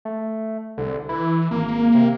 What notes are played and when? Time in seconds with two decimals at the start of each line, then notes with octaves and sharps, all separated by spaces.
0.05 A3
0.78 C2 D3
1.09 E3 E4
1.51 G#1 A#3
1.95 C3